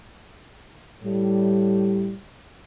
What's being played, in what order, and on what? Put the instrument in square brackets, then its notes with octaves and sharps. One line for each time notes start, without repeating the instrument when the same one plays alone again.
[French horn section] A2 G3